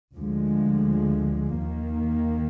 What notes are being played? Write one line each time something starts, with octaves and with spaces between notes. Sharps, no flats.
D2 D3 F3 G#3
D#2 D#3 A#3